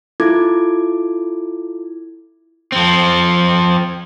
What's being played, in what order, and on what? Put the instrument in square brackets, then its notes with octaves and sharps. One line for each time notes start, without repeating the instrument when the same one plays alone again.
[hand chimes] E4 F4 A4 D6 G#6
[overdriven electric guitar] F3 C4